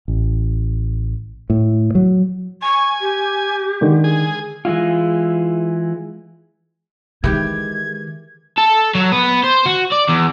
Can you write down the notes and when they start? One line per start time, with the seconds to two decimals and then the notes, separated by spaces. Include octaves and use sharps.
0.08 A1
1.50 A2
1.95 F#3
2.62 G#5 C#6
3.00 G4
3.81 D3 D#3 G#3
4.04 G#4
4.65 E3 G#3 E4 F4
7.24 D#3 E3 G#3 G4 G#6
8.58 A4
8.95 F#3
9.12 B3
9.44 C5
9.66 F#4
9.92 D5
10.09 E2